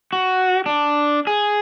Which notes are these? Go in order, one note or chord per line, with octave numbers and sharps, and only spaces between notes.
F#4
D4
G#4